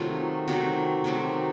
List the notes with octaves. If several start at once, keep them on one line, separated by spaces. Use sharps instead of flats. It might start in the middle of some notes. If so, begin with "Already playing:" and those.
Already playing: C3 D#3 F#3 A3 F4
C3 D#3 F#3 A3 F#4
C3 D#3 F#3 A3